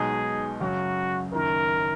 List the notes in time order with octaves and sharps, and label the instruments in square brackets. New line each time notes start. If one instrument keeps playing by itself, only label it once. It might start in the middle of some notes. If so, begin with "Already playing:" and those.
Already playing: [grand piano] B1 B2 G#3 D#4 F#4 [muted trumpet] G#4
[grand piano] F#2 C#3 F#3 [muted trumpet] F#4
[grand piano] F#1 F#2 D#3 [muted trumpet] A#4